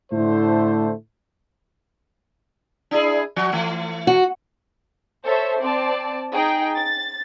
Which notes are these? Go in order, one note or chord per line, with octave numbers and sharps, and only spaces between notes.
A2 D3 A3 E4 C5
D4 E4 G#4
F3 F#4
E3 A3
F#4
A4 C5 C#5 E5
C4 D5 A5
D#4 G#4 G5
A6